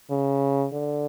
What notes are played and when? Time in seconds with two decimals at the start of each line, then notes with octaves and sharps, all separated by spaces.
0.10 C#3
0.73 D3